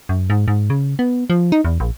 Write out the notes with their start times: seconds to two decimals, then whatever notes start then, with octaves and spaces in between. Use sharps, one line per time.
0.09 F#2
0.30 G#2
0.48 G#2
0.70 C#3
0.99 B3
1.30 F3
1.52 D#4
1.65 E2
1.80 A#1